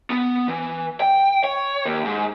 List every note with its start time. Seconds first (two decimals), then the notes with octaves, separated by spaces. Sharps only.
0.10 B3
0.48 E3
1.00 G5
1.44 C#5
1.85 D#2
2.05 G#2